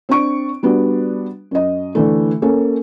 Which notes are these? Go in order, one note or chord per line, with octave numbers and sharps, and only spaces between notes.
C4 D4 C#6 D7
G3 B3 D4 F#4
F#2 D#5
D3 E3 A3
A#3 C#4 A4